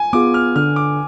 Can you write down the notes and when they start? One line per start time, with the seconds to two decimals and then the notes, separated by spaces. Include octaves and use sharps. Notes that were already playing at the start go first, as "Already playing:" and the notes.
Already playing: G#5
0.13 B3 F4 G#4 D6
0.34 F6
0.56 D3 F6
0.76 D6